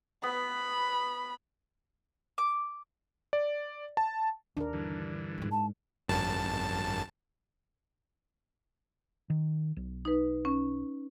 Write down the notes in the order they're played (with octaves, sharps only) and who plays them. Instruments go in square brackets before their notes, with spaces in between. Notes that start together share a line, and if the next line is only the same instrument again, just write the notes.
[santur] B3 [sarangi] B5
[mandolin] D6
[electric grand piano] D5
A5
[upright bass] D#2 C3 [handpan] D4 A#4
[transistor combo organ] G2 D3 E3
[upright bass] G#2 G#3
[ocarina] A5
[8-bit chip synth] G#1 F#2 A5
[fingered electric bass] D#3
B1
[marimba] D#4 B4
C#4